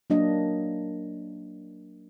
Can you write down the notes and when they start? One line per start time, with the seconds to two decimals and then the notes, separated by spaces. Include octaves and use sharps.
0.10 F#3 A#3 D4 D#5